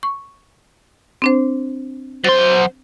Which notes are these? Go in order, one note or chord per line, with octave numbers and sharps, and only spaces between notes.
C#6
C4 D4 C5
F#3 C5 C6 A6